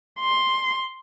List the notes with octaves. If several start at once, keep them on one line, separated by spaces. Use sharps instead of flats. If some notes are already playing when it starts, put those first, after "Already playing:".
C6